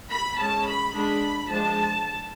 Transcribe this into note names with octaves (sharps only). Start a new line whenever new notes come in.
B5
G#3 C#4 A5
B5
G#3 D4 B5
F3 G#3 D4 A5